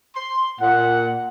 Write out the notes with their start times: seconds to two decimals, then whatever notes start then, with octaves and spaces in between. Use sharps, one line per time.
0.16 C6
0.61 A#2 F#5